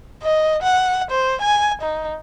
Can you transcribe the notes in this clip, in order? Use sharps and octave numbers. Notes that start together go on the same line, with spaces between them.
D#5
F#5
C5
G#5
D#4